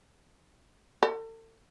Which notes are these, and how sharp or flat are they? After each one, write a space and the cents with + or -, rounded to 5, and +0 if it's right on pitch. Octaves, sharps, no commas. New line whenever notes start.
A4 +40